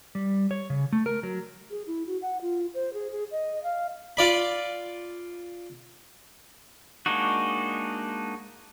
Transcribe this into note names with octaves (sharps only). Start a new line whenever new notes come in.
G3
C#5
C#3
A3
A#4
F#3
G#4
E4
F#4
F#5
F4
C5
G#4
G#4
D#5
F5
F4 D5 B5
G#3 A#3 D4 D#4 F#4